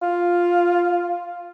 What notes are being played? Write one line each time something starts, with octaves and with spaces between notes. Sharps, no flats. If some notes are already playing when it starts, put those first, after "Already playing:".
F4